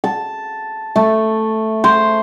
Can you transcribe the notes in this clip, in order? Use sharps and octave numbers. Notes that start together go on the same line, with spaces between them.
A5
A3
C5